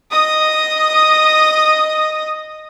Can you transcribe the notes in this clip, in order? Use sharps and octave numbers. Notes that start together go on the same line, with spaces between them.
D#5 D#6